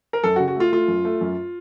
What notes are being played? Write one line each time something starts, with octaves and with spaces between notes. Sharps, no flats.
A#4
F#2 A4
F#4
C#3
F#4
A3 F4
A3 F4
F#2
A3
F#2